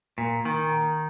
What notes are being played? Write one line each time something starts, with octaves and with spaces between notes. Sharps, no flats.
A#2
D#3